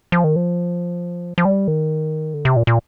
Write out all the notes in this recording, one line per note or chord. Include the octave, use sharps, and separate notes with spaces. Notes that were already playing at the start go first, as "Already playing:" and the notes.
F3
D#3
F3
F3
G3
D#3
D3
C3
A#2
A#2